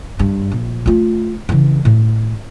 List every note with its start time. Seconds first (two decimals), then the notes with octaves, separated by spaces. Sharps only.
0.19 G2
0.52 A#1
0.86 A3 F4
1.49 C#3 E3
1.85 A2